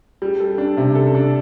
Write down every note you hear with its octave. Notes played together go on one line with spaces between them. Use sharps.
G3
A4
D4
C3
A4
D4